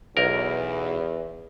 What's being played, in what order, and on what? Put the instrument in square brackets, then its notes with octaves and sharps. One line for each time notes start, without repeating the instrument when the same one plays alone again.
[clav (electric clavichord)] B1 A#4 [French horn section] E2